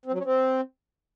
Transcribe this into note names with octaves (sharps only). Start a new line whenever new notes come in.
C4
F#3
C#4
C4